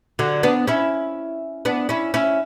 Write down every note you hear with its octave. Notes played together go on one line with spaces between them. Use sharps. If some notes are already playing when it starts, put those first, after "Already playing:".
D3 F#3
B3 D4
C#4 E4
B3 D4
C#4 E4
C#4 E4